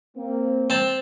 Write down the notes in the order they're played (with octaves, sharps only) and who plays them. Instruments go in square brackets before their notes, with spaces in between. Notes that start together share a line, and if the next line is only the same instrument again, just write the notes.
[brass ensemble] A#3 C4
[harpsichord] C4 A5